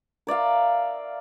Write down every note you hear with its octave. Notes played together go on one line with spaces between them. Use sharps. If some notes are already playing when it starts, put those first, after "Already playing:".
A#4 D5 E5 F5